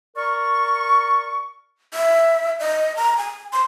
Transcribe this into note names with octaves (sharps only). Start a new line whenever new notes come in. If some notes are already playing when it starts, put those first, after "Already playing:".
A#4 D5 C#6
E5
D#5
A#5
G#5
C6